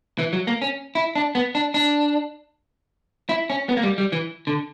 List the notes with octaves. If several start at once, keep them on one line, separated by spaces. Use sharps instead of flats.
E3
F#3
A#3
C#4
E4
D4
B3
D4
D4
E4
C#4
B3
A#3
G3
G3
E3
D3